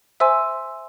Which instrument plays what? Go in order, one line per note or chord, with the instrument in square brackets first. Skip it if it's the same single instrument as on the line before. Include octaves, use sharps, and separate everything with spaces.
[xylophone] C5 E5 G#5 C6 E6